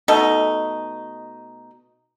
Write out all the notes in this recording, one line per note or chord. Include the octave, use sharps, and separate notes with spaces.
B2 A3 D#4